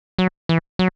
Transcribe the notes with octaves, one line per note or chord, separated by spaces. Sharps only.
F#3
E3
F#3